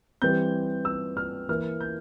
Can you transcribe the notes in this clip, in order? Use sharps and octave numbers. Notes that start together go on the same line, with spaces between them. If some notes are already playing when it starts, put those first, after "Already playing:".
E3 G3 C4 G6
E6
F6
E3 A#3 F6
G6